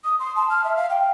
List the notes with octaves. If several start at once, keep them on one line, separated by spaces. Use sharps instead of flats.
D#6
C6
A5
F6
E5
F5
G5